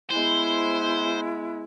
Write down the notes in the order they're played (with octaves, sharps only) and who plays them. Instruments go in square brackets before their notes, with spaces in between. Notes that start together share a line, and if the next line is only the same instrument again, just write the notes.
[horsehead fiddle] G#3 B3 [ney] E4 [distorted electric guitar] C5